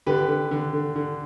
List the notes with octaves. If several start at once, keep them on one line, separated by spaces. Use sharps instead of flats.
D3 G4 B4
D3
D3
D3
D3